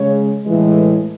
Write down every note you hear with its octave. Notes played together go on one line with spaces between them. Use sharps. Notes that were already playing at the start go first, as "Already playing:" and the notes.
Already playing: C#3 G#3 C#5
A2 E3 G#3